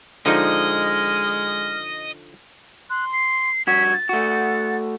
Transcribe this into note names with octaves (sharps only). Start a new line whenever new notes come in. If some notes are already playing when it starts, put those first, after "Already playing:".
D3 F3 G#3 D#4 D#5 F6
C6 F#6
C7
G2 F#4 G#6 B6
A6
A3 F#4 F#5